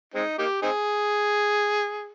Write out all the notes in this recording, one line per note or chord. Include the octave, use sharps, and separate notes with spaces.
G#3 C4 D#4
A#3 D#4 G4
C4 D#4 G#4